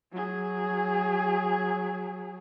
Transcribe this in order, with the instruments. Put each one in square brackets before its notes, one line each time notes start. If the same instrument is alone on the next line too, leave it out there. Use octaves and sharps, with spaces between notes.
[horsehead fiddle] F#3 G#4